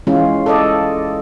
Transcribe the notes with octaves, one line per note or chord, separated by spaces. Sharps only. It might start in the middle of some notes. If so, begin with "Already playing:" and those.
E3 G#3 C#4 F4
A4 D5 D#5